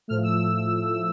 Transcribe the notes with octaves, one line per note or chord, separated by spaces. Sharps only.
A2 F3 A3 F6
E6